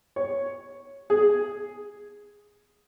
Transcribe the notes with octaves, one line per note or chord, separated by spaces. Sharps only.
C#5
G#4